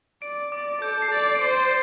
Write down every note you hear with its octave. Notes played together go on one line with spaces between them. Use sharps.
D5 D7
D5 D6
A4 G6
C7
D5 A6
D7
C5 C7